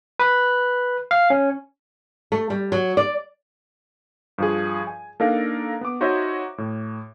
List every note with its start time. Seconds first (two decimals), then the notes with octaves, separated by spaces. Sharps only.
0.19 B4
1.11 F5
1.30 C#4
2.32 A3
2.50 G3
2.72 F#3
2.97 D5
4.38 G2 F3 G#4
4.87 G#5
5.20 A#3 D4 D#4 A4 A#4 F5
5.81 B3 D6
6.01 D#4 F#4 C5 C#5 D#5 E5
6.58 A2